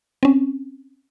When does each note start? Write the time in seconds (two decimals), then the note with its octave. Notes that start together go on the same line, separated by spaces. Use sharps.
0.23 C4 C#4